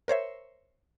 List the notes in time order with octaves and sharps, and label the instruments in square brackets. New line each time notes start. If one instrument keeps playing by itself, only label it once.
[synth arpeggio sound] A#4 C5 C#5 E5